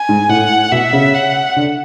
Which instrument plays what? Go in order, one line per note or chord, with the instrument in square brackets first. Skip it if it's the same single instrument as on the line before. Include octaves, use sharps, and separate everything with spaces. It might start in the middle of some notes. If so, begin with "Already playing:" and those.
Already playing: [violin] G#5
[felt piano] G#2
[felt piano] A2 [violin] F#5
[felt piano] B2 [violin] E5
[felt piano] C#3
[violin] F#5
[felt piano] D3